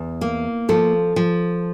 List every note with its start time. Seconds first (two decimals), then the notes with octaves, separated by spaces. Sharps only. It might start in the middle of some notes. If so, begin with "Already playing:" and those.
Already playing: E2
0.21 A#3
0.69 F3 A4
1.16 F3